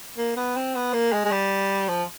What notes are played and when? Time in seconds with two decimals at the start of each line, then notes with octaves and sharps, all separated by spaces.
0.18 A#3
0.36 B3
0.56 C4
0.75 B3
0.93 A#3
1.13 G#3
1.25 G#3
1.31 G3
1.88 F3